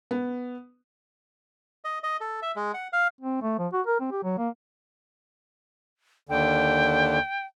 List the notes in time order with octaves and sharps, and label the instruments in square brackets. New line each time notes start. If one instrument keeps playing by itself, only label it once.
[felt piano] B3
[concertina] D#5
D#5
A4
E5
G#3
F#5
F5
[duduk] C4
A3
F3
F#4
A#4
C4
G4
F#3
A#3
[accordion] D#2 D3 [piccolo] G5